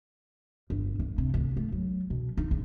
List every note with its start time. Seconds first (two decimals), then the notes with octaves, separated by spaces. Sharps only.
0.70 G1
0.99 G1
1.18 C3
1.34 D2
1.57 A3
1.72 F#3
2.10 B2
2.37 D#4
2.51 A#1